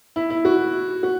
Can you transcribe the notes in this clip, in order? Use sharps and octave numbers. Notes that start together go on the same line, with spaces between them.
E4
E4
F#4
F#4